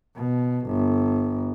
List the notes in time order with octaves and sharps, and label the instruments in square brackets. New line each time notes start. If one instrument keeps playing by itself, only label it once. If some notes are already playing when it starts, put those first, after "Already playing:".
[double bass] B2
G1